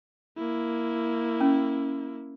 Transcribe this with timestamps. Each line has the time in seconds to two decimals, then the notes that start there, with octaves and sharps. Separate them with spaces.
0.37 A#3 E4
1.41 C#4